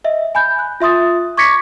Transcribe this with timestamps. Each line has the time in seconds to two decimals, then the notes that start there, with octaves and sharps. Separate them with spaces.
0.04 D#5 E5
0.35 G#5 B5 G6
0.59 F#6
0.80 F4 E5 C6 D#6 A6
1.37 C#6 D6 G#6 A#6 B6 C#7